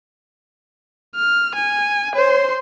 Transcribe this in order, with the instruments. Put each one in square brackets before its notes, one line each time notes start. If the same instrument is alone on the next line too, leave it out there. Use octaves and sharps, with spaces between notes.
[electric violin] F6
G#5
[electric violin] C5 C6 [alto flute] C#5